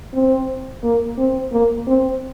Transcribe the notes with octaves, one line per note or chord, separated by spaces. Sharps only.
C4
A#3
C4
A#3
C4